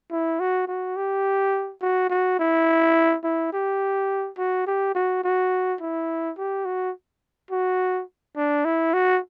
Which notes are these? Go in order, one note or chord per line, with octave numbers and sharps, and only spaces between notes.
E4
F#4
F#4
G4
F#4
F#4
E4
E4
G4
F#4
G4
F#4
F#4
E4
G4
F#4
F#4
D4
E4
F#4